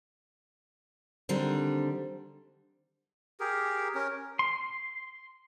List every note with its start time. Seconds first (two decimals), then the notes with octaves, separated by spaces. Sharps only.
1.29 D3 D#3 G3 C4 D4
3.40 G4 G#4 A#4
3.95 C#4 A#4
4.39 C6